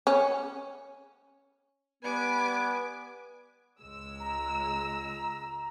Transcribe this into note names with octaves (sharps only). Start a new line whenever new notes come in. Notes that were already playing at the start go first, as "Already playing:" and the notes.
C#4
G3 B3 B4 G#5 D6
C#2 G#3 E6
A#5